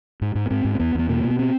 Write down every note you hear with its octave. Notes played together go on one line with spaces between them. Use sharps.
G#2
G#2
B3
G#2 C4
G#2
C4
E2 B3
E2 B3
B2 A#3
B2
B3
C4